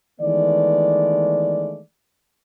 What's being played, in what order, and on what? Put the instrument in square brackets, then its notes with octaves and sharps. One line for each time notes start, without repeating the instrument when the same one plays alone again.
[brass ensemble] D#3 E3 G#3 A3 B3 D5